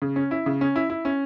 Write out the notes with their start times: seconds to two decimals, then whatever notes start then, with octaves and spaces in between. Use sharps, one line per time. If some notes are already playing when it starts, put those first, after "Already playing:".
0.02 C#3
0.16 C#4
0.31 E4
0.46 C#3
0.61 C#4
0.76 E4
0.90 E4
1.05 C#4